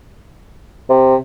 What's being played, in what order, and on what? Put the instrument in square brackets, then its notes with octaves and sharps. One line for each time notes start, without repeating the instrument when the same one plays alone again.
[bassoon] C3